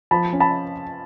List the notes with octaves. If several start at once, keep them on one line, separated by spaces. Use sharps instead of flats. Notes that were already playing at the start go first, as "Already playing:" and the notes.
F3 A5 B5
C#4
A5 B5